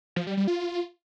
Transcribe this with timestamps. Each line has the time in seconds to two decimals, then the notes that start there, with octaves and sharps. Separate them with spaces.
0.16 F3
0.27 G3
0.37 G3
0.48 F4